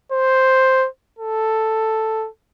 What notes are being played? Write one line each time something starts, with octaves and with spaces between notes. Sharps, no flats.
C5
A4